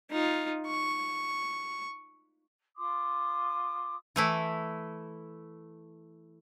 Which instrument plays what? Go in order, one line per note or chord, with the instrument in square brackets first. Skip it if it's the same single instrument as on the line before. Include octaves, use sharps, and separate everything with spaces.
[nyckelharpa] D#4 F4
C#6
[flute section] F4 C6 D6 D#6
[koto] E3 A3 E4